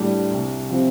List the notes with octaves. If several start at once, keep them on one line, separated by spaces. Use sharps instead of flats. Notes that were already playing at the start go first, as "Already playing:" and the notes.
Already playing: A2 G3 D4 G4
C2
C3 F3 C4 G4